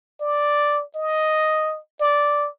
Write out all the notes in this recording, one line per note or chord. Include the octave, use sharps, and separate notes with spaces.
D5
D#5
D5